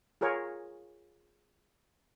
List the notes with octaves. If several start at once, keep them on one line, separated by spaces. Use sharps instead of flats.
F4 G#4 A#4 C#5